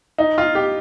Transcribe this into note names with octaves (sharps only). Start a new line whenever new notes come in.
D#4
F4
G4